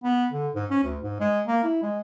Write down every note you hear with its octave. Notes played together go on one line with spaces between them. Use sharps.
B3
D3
G#2
C#4
D2
G#2
G#3
A#3
E4
G#3